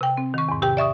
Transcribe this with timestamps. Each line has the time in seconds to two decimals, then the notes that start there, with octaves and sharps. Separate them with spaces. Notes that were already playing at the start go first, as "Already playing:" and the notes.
0.01 C3 G5
0.17 C4
0.34 D#3 C#6
0.49 E2 G#2
0.62 C3 G4 G5
0.77 D5 E5 C#6 D#6